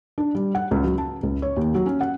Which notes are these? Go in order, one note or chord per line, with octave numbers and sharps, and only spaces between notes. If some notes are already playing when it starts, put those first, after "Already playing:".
D4
G3
F#5
C#2
F#3
A5
C#2
C#5
D#2
F#3
C#4
F#5